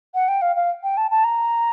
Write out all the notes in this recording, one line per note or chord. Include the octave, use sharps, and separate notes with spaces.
F#5
G5
F5
F5
G5
A5
A5
A#5